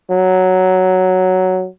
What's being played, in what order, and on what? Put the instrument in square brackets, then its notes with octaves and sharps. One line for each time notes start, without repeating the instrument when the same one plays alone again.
[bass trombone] F#3